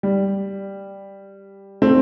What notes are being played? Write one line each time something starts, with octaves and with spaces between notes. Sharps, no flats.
G3
A3 C4